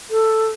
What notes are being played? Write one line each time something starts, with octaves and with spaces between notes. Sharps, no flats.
A4